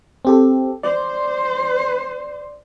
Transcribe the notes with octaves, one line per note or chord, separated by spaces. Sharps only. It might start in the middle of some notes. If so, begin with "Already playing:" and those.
C4 G4 A4
C5 D5